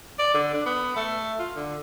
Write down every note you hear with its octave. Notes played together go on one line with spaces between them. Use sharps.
D5
D3
D4
B3
A3
F4
D3